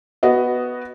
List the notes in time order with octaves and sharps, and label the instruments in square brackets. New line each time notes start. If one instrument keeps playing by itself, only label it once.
[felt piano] B3 F#4 D#5